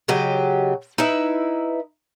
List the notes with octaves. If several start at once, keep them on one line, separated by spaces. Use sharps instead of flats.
C#3 F#3 G4 D#5
D#4 E4 B4 E5